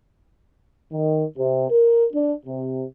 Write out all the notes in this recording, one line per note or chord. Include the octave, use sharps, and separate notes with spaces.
D#3
C3
A#4
D4
C3